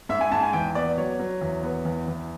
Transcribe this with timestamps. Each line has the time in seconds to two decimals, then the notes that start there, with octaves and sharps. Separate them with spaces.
0.09 G#2 E5
0.21 G#5
0.32 G#2 A5
0.43 G#5
0.53 E2 G5
0.75 B3 D5
0.98 F#3 C#5
1.20 F#3
1.42 E2
1.63 B3
1.85 E2
2.08 E2